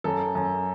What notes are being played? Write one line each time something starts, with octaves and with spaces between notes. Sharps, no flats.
F#2 A4
F#2